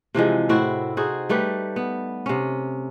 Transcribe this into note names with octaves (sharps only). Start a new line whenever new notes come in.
C3 E3 F3 G#3
A2 C4 E4 F#4
D#4 F#4 G#4 C5
G3 A3 G4 B4
B3
C3 C#4